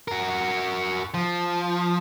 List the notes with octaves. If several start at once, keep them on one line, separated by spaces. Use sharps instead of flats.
F#4 A#4
F3